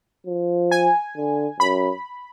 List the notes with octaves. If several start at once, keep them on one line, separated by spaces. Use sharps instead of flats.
F3
G#5
D3
F#2 B5